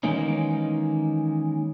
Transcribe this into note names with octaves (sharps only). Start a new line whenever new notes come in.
D#3 E3 G#3 A#3 C#4 D#4